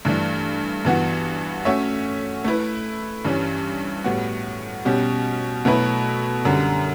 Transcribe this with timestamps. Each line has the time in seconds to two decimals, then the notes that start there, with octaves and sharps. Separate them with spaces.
0.05 G2 E3 A3 D4
0.85 G2 E3 B3 F#4
1.65 A3 C#4 F#4 C#5 E5
2.44 A3 E4 B4
3.25 G2 E3 G3 C#4
4.04 A2 G3 B3 F#4
4.85 B2 G3 C#4 G4
5.65 B2 F#3 A3 E4 B4
6.45 F#2 D3 G3